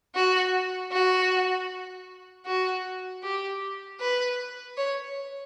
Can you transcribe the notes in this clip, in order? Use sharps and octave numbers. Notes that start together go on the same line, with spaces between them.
F#4
F#4
F#4
G4
B4
C#5